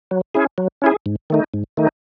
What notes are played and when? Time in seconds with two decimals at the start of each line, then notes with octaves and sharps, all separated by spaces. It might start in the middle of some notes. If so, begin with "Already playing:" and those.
0.11 F#3
0.35 C#4 E4 G#4
0.58 F#3
0.82 C#4 E4 G#4
1.06 G#2
1.30 D#3 A3 D#4
1.54 G#2
1.77 D#3 A3 D#4